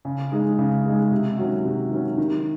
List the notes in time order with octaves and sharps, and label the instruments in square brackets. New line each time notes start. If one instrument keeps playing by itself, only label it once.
[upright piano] C#3
G#3 D#4 G#4
C#3
G#3 D#4 G#4
C3
D#3 F#3 C#4 F#4
C3
D#3 F#3 C#4 F#4
D#3